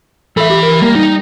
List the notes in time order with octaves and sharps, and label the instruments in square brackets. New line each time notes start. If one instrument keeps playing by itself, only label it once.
[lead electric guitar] E3 B5 [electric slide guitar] A4 E5
[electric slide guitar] G4
A#4
[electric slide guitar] G3 [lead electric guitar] A#3
[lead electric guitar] D#4